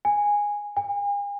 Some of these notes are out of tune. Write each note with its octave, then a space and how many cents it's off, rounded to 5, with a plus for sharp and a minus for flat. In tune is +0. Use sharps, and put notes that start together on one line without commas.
G#5 -10
G#5 -40